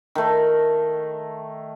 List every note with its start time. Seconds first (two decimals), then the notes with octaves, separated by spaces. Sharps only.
0.15 D#3 A3